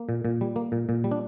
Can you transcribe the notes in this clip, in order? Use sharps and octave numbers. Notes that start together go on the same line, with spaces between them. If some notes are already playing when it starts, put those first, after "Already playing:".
Already playing: A#3
A#2
A#2
G3
A#3
A#2
A#2
G3
D4